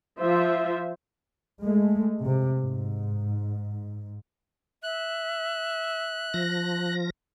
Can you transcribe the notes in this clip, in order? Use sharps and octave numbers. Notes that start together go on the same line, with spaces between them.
F3 F4 C5 E5
G#3 A3
C3
G#2
E5 F#6
F3 A#6